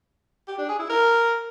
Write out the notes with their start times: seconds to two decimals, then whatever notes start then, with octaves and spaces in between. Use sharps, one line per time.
0.48 G4
0.58 D4
0.69 G#4
0.79 E4
0.89 A#4